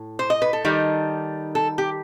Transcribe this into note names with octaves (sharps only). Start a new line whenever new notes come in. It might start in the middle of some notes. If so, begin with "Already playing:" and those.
Already playing: A2
C5
D#5
B4
A4
D#3 G3 D#4
A4
G4